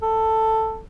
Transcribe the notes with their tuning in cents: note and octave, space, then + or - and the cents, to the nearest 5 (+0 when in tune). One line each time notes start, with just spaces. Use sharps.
A4 +10